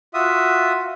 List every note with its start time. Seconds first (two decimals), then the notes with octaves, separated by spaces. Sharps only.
0.14 F4 F#4 E5 D#6